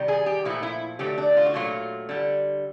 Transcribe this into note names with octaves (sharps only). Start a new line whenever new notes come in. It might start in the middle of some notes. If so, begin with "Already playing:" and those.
Already playing: C3 D#3 G3
G#4
G4
A#2 F3 A3 E4
E4
D3 F#3 A3 G4
D4
F4
F#4
A#2 F#3 A3 F4
D3 G3